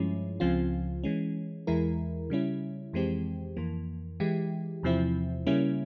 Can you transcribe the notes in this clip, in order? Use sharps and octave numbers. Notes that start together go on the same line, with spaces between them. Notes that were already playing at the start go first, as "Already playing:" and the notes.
Already playing: G2 F3 G#3 C#4 E4
C#2 C#3 F3 C4 F4
E3 G#3 C#4
E2 E3 G#3 E4 A#4
C#3 G3 C#4 E4
F2 E3 G#3 C4 G4
F2 E3 A#3
E3 G#3 E4 G4
E2 C3 F3 C4 E4
C#3 G3 A#3 C#4 E4